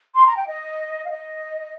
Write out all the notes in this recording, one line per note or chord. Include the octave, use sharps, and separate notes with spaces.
C6
A#5
G5
D#5
F5
D#5